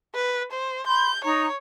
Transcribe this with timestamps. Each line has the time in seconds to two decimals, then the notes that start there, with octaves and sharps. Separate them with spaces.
0.14 B4
0.51 C5
0.87 B5 C6 G6
1.24 D#4 C#5 A#5